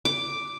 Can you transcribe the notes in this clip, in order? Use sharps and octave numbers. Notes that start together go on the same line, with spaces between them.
D6